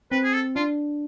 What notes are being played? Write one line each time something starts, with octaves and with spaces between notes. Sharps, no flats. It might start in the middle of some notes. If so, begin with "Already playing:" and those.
C4 B4
G#4
A4
D4 F4